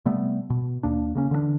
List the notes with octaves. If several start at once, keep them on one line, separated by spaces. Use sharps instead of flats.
C3 G3 A3 B3
B2
D#2 A#3 D4
C#3 A#3 C#4
D3 E3 A3 D4